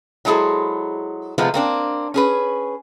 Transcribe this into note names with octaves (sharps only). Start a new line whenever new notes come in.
F#3 G#3 E4 G#4 A4 C5
C3 F3 G#3 A3 B3
A#3 C4 D4
C#4 G#4 B4